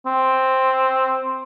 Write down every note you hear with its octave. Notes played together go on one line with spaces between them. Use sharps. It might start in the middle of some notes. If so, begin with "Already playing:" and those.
C4